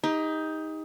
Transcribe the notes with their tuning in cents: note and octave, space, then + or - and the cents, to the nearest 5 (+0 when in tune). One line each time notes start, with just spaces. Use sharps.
D#4 +15 G4 +40